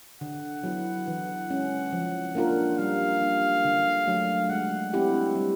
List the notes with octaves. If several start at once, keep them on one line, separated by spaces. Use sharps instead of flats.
D3 F#5
F#3 B3 E4
E3
G#3 C#4
F3
A#3 D4 F4 A#4
G3 F5
A#3 D4
D3
F#3 A3 D4
G#3 F#5
C4 E4 G4
G3